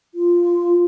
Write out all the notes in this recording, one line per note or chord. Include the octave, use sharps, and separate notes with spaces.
F4